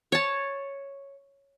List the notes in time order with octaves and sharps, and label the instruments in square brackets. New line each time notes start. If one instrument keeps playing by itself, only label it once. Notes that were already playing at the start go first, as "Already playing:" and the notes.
[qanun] C#5 A5